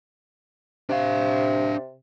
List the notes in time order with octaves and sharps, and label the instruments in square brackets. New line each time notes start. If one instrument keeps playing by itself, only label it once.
[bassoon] C3 [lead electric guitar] D4 F5